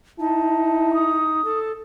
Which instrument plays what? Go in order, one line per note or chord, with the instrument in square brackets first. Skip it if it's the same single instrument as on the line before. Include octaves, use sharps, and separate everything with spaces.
[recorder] D#4 [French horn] E4 [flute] A5
[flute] D#6
[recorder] A4